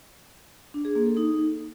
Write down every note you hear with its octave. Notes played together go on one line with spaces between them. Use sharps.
D4
G#4
A#3
A4
D#4